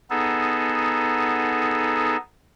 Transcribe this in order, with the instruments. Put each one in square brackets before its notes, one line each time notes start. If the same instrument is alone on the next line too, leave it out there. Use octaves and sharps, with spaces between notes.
[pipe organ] B3 D#4 G#4 A4